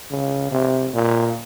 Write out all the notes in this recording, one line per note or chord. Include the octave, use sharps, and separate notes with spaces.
C#3
C3
A#2